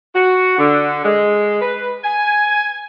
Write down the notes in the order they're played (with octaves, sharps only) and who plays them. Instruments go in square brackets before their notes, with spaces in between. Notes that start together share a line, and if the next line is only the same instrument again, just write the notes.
[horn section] F#4
D3
G#3
B4
G#5